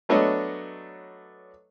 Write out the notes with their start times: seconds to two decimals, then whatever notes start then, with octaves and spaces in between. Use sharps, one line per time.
0.09 F#3 A3 B3 D4 C#5 D#5